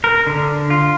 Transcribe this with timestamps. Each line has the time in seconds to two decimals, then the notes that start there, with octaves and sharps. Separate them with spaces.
0.04 A#4
0.27 D3
0.70 F4